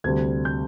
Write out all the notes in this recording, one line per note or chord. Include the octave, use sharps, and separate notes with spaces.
D2 C3 G3 G#6
G6